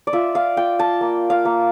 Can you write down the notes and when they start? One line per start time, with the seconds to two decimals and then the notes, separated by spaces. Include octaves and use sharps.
0.07 D5
0.13 F4 E5
0.35 F5
0.57 F4 G5
0.79 A5
1.01 A#3
1.30 F5
1.45 A#3